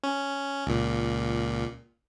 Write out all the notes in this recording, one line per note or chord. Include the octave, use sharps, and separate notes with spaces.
C#4
C#2 A#2